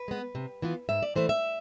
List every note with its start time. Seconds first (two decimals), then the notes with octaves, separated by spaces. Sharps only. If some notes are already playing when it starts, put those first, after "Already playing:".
Already playing: B4
0.08 G#3 B3
0.35 C3
0.62 E3 B3 F4
0.89 G#2 E5
1.03 D5
1.16 E3 A3 C5
1.29 E5